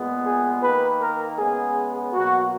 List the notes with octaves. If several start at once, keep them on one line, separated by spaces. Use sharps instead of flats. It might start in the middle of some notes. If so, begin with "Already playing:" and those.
Already playing: A#2 G#3 B3
G#4
D#3 A#3 B4
A#4
C#3 G#3 B3 G#4
B2 F#3 A#3 F#4